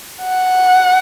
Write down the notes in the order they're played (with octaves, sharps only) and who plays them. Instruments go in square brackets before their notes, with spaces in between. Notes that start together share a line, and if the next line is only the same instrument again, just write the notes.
[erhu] F#5